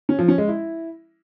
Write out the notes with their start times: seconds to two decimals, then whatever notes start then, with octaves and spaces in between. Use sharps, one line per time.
0.09 C#4
0.19 F3
0.28 C#4
0.38 G#3
0.48 E4